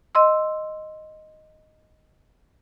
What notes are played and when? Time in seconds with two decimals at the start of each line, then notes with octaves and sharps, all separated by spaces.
0.15 D#5 C6 E6